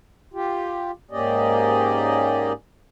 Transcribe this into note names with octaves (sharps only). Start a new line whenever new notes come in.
F4 G4
G#2 A#3 C#4 G4 D5 D#5